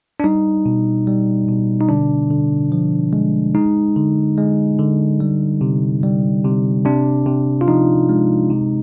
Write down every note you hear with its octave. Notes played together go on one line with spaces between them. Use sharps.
D4
G3 D#4
B2
G3
B2
D#4
D3 D4
D3
F3
G#3
G#3 D#4
D3
G#3
D3
G3
C3
G3
C3
C3 D4
C3
F4
F3 D#4
G#3
C3